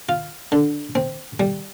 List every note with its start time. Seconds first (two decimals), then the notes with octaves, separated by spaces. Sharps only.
0.09 F4
0.52 D3
0.95 C4
1.40 G3